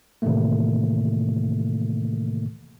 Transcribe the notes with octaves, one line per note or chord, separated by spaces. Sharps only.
A2 C3 D#3 E3 A3 A#3